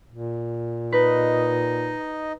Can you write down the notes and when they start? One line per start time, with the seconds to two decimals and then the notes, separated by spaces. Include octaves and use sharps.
0.11 A#2
0.92 D#4 B4 D#5